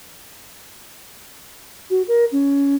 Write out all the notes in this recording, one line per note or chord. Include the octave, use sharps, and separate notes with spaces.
F#4
A#4
C#4